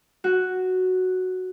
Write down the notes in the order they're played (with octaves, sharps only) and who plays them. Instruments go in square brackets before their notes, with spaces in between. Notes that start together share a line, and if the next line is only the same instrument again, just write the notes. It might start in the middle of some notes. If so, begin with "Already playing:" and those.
[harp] F#4